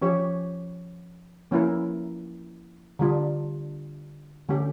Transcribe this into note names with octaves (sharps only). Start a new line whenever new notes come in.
F3 C#4 G4 C#5
F3 A#3 C#4 E4 A#4
D3 G3 D4 F4
D3 A3 C#4 G4